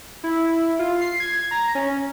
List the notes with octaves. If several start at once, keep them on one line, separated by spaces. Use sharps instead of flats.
E4
F4
C7
G#6
A#5
C#4